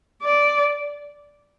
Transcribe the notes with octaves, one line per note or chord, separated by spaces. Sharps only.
D5